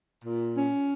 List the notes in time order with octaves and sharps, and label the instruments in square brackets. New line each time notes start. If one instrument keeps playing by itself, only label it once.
[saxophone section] A#2
C#4